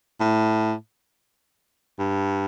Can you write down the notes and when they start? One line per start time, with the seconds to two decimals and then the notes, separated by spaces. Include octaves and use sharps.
0.20 A2
1.99 G2